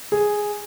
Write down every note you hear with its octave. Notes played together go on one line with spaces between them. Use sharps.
G#4